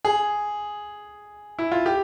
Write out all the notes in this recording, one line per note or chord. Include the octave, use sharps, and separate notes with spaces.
G#4
E4
F4
G4